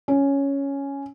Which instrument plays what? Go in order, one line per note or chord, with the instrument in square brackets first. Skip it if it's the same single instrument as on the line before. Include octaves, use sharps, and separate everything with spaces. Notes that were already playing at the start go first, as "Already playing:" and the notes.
[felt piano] C#4